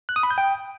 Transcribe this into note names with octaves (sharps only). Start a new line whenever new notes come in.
F#6
D#6
B5
G6
G5